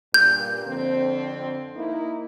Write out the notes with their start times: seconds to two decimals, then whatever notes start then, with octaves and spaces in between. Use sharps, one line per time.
0.14 G2 A#2 G6
0.66 F2 D3 C4
1.76 A#3 D#4 E4